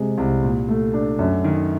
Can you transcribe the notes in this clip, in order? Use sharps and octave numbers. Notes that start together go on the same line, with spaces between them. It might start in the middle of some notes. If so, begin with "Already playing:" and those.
Already playing: C3 G#3
C2
A#2
A3
D4
F#2
D#3